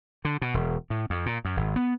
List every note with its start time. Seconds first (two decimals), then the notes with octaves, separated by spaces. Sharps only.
0.25 D3
0.42 B2
0.54 E1
0.90 A2
1.10 F2
1.26 A#2
1.45 F#2
1.57 G#1
1.76 B3